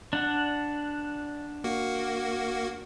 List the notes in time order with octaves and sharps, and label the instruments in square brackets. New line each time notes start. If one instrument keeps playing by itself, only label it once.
[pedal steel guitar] D4 F#5
[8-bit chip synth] A#3 F#4